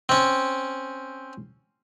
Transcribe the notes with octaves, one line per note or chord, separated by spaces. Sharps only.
C4 C#4